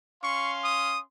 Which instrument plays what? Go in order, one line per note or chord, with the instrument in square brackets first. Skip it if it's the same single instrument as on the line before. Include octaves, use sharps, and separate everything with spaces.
[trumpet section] C#4 F5 C6 [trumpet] C#6
[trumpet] D#6